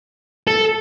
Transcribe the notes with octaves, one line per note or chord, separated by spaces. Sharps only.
A4